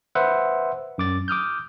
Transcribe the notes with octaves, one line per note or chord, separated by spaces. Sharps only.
B4 C5 E5 F#5
F#2 D6 A6
D6 D#6 F6 G6